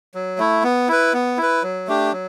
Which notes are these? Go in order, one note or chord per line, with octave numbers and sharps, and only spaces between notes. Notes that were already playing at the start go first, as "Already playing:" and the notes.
F#3
A3 E4
B3
E4 B4
B3
E4 B4
F#3
A3 D4 G4
F#3